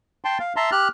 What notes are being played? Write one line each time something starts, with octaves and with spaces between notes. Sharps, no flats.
G5 A5 C6
F5
E5 A5 A#5 C6
G4 F6 F#6